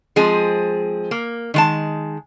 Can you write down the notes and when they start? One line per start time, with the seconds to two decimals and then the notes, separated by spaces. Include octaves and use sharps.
0.16 F3 G#3 C4 G#4
1.11 A#3
1.54 D#3 G#3 A5